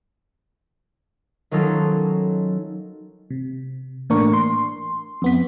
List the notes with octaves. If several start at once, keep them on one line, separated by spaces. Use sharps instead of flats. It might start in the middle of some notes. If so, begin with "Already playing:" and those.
D#3 F#3 C#4 D#4 F4 A4
C3
A2 E3 A#3 D4 A#4 C#6
C6
F2 B3 B6